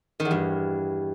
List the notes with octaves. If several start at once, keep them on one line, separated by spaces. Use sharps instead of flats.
D#3
E2
G2